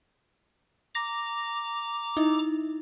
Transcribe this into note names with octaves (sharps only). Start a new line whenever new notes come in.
A#5 D6 A#6
D#4 E4